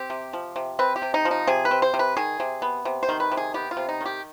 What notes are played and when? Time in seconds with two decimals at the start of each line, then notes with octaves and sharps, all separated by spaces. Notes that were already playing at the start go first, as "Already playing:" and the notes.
Already playing: C4 G4
0.10 C3
0.33 F3
0.56 C3
0.79 C4 B4
0.96 G4
1.02 C3
1.14 D#4
1.25 F3
1.31 D#4
1.47 C3 G#4
1.65 B4
1.71 C4
1.82 C5
1.94 C3
1.99 B4
2.17 D#3 G#4
2.40 C3
2.62 B3
2.85 C3
3.03 C5
3.09 D#3
3.20 B4
3.32 C3
3.37 G#4
3.54 B3 G4
3.71 F4
3.77 C3
3.89 D#4
4.01 D#3 G4